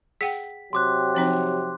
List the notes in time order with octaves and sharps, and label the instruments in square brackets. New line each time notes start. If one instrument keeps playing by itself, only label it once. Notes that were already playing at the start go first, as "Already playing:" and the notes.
[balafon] G#4 F#5 G5 [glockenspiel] B6
[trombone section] C3 F#3 G4 [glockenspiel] C6 D6 F#6
[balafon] F3 C4 D#4